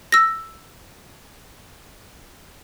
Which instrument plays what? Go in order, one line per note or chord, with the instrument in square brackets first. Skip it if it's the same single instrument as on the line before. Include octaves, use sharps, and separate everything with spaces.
[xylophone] E6 A#6